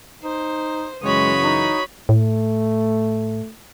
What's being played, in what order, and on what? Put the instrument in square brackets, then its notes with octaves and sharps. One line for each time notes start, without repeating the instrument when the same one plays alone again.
[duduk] D#4 [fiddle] C5
[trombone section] F#2 C#3 E3 [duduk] G#3 [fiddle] F#4 B5 [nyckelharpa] C#5 D#6
[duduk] D#4
[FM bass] A2 [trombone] A3